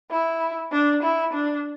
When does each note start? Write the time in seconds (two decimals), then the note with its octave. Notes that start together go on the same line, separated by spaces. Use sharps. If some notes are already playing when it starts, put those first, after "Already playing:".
0.11 E4
0.72 D4
1.03 E4
1.33 D4